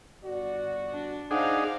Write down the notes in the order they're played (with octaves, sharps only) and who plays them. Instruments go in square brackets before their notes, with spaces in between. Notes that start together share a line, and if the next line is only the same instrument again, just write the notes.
[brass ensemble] G1 F#4 D5
[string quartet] D4
[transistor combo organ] D4 D#4 G#4 [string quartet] C5 F5 A#5 [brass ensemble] F#5